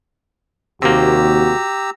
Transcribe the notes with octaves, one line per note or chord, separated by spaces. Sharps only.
D#2 C3 A#3 F#4 G4 A#5 E6